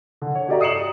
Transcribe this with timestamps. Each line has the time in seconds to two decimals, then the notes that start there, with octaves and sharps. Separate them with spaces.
0.22 D3
0.35 C#5
0.48 F#4 G4 A4 D5 E5 A#5
0.61 D#6 C7 C#7 E7 F#7